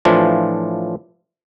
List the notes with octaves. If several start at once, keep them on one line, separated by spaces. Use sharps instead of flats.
A2 E3 F3 D4 F4